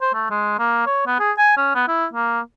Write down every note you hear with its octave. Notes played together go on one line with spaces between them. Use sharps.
C5
A3
G#3
A#3
C#5
B3
G#4
G#5
C#4
B3
E4
A#3